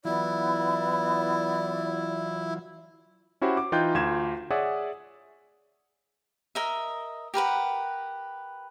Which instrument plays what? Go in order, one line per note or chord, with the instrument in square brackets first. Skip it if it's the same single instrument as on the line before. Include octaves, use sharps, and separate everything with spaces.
[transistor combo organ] E3 F#3 F4 [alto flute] B3 [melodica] E4 [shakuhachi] D5
[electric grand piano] C#4 E4 F#4 G4 C5
D6
E3 D#4 F4 G5 F#6 G6
D2 F4 G#6 E7
G#4 C#5 D5 E5 F#5 D#6
[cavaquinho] A#4 D#5 E5
G4 A#4 B4 F#5